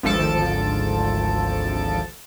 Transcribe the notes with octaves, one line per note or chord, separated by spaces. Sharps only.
G#1 D2 F3 A4 A5 D7